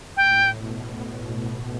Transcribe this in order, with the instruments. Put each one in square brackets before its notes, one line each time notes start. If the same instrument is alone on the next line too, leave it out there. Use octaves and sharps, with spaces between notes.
[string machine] A2 [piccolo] G5
[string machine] B2